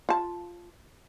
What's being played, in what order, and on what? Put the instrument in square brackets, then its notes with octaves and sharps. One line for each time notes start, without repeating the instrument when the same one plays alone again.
[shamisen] F4 A5